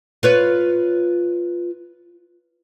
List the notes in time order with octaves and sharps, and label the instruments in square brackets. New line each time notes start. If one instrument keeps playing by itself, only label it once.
[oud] F4 B4 C#5